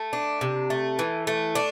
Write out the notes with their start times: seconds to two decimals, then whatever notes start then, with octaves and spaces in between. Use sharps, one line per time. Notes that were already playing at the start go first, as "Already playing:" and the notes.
Already playing: A3
0.13 D4
0.41 C3
0.70 A3
0.99 E3
1.27 A3
1.55 D4